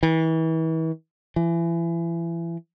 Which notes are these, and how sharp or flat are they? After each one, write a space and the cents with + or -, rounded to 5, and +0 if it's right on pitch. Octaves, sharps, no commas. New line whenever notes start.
E3 -35
E3 +30